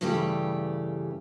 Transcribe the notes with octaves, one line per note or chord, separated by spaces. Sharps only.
G2 C#3 E3 G3 A3 G4